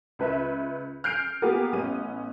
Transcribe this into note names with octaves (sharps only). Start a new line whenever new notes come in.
C#2 B4 E5
F6 G6 C7 D7
A#3 B3 F4 G4 G#4
A1 B3 C#4 D#7